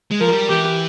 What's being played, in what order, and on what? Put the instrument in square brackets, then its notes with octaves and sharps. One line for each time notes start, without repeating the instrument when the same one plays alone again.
[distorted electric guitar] G#3
[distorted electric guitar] F3 [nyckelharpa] A#4
[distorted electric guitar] G3
[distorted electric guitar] E3 [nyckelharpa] G4